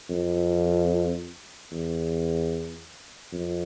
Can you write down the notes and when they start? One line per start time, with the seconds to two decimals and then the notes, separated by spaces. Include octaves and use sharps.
0.10 F2
1.72 E2
3.33 F2